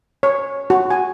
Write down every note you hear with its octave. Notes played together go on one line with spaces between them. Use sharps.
C#5
F#4
G#5